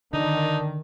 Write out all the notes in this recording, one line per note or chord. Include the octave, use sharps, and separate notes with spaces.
D3 D#3 D4 D#4